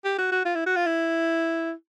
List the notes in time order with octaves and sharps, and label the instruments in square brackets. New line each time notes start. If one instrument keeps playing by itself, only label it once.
[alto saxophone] G4
F#4
F#4
F4
E4
F#4
F4
E4